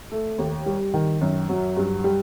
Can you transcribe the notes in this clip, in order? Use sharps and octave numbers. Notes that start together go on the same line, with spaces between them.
A3
D#2
G3
D#3
F#2
F#3
G2
G3